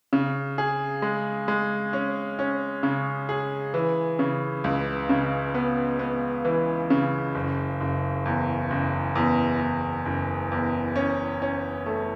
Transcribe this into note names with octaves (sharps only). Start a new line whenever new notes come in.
C#3
G#4
G#3
G#3
C#4
C#4
C#3
G#4
E3
C#3
C#2
C#3
B3
B3
E3
C#3
F#1
F#1
E2
F#1
E2
E2
F#1
E2
C#4
C#4
A3